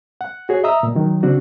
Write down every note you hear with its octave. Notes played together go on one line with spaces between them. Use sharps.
F#5
F#4 G#4 C#5
D#5 E5 A#5 D#6 E6
A#2
D#3 F#3
C#3 C4 D4 F#4